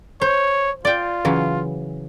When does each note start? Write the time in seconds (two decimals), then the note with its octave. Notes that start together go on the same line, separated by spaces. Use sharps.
0.22 C5 C#5
0.85 F4 D5 G5
1.25 C#3 E3 F#3